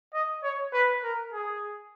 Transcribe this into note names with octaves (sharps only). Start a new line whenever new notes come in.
D#5
C#5
B4
A#4
G#4